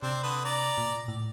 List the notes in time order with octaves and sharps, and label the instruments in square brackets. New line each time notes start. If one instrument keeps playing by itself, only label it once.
[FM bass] C3 [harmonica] C4 D4 C5
[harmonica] D3 B4 D#6
D5 A#5
[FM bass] A#2
A2